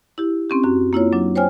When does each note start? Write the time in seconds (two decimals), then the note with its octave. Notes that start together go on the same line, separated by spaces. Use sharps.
0.18 E4 G4
0.50 C4 C#4 G4
0.64 F#2 F#4
0.93 A#3 E4 F4 C#5
1.13 F#3 D4
1.36 C5 C#5 G5 G#5 F6